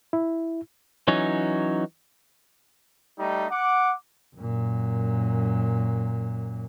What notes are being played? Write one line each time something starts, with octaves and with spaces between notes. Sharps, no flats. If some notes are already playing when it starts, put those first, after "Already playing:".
E4
E3 F#3 C#4 D#4 C#5
G3 A3 D#4
F#5 D6
F#2 A#2